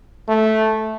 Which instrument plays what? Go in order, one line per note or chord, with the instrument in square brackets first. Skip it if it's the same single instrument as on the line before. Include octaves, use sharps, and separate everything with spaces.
[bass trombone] A3